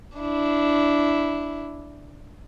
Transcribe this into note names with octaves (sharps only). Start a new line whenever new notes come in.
D4 E4